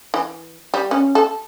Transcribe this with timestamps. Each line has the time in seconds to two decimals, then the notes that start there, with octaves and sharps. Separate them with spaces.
0.14 E3
0.74 G3
0.91 C#4
1.15 A4